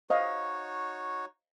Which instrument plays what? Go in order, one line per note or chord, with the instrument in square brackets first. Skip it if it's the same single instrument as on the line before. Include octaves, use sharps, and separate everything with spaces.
[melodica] D#4 F#4 C#5 [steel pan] C5 D#5 F5